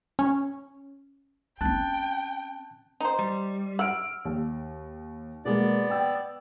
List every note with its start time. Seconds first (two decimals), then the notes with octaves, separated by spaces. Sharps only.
0.19 C#4
1.61 C4 C#4 G5 A5 F#6
3.00 D#4 C5
3.19 G3
3.79 F#5 E6 F6 D7
4.25 D#2
5.45 B2 G#3 A#3 B3 D5
5.90 G5 E6